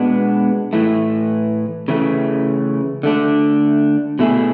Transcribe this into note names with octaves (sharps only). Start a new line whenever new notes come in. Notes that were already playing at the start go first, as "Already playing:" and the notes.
Already playing: B2 G#3 B3 D4
A2 E3 A3
C#3 E3 A3
D3 A3 D4
B2 A3 E4 G#4